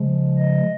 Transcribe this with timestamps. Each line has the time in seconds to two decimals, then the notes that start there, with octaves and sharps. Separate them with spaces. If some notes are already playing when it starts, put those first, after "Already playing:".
Already playing: C#3 F3 G#3
0.38 D#5